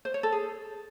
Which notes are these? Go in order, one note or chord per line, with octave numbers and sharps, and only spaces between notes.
C5
C#5
A4
G#4